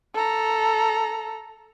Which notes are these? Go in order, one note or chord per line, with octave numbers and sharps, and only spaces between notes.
A4 A#5